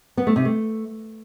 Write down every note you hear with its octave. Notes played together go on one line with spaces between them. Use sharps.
B3
A3
C3
A3